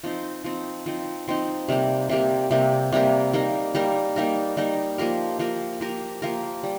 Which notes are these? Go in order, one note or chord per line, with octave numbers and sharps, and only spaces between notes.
F3 C4 D#4
F3 C4 D#4
F3 C4 D#4
F3 C4 D#4
C3 G3 A#3 G4
C3 G3 A#3 G4
C3 G3 A#3 G4
C3 G3 A#3 G4
G3 A#3 D#4 A#4
G3 A#3 D#4 A#4
G3 A#3 D#4 A#4
G3 A#3 D#4 A#4
F3 A#3 G4 A#4
F3 A#3 G4 A#4
F3 A#3 G4 A#4
F3 A#3 G4 A#4
G3